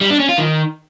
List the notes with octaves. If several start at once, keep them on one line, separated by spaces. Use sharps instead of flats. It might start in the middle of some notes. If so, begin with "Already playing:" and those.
G3
D4
C#4
F4
D#3